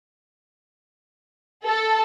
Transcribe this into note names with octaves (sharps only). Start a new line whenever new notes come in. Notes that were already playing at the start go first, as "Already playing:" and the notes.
A4